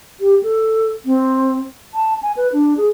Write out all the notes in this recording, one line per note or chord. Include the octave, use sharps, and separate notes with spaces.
G4
A4
C4
A5
G#5
B4
D4
G#4